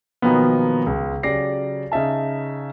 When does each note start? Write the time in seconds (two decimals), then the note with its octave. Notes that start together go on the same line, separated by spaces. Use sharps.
0.22 B2 D#3 F3 F#3 A#3 B3
0.86 C#2
1.23 C#3 F#3 G4 D5 A#6 C7
1.92 C#3 D#4 E5 A5